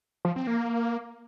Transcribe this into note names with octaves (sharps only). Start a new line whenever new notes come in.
F3
C4
A#3